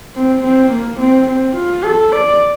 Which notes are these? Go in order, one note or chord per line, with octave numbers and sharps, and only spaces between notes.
C4
C4
A#3
C4
C4
F4
A4
D5